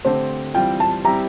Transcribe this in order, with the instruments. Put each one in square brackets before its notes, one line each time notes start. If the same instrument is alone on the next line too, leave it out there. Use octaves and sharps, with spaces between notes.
[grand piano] D3 A3 C4 G4 [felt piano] C5
[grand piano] E3 G3 C4 F4 [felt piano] G5
[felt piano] A5
[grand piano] G3 C4 E4 G4 [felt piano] A#5